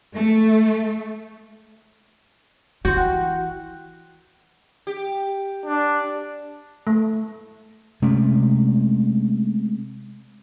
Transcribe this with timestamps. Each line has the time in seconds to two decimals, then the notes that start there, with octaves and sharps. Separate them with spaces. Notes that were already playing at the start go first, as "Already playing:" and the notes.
0.15 A3
2.85 E3 F#4 C6 G6
2.96 F#5 G5 F#6
4.87 G4
5.66 D4
6.87 A3
8.02 C3 G#3 A3 C#4